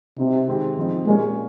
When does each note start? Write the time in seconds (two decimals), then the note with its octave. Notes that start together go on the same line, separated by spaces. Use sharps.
0.18 C3 G3 C4 D#4
0.48 D#3 G#3 C4 G4
0.76 G#2 F3 C4 D#4
1.06 A#2 G3 G#3 A#3 C#4